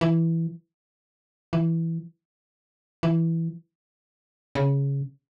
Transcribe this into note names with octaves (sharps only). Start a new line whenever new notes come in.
E3
E3
E3
C#3